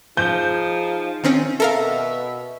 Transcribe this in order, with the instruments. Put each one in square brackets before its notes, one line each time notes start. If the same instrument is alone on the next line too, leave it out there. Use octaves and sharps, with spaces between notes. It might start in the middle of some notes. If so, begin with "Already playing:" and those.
[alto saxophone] F3 [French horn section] D#4 G#4 [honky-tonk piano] G6
[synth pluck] D#3 C4 C#4
[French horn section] B2 [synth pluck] A4 A#4 F5 [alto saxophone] E5